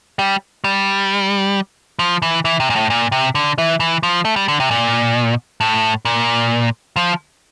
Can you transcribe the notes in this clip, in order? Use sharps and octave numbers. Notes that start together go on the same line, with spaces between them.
G3
G3
F3
E3
E3
C3
A#2
A2
A#2
C3
D3
E3
E3
F3
A3
G3
D3
C3
A#2
A2
A#2
F3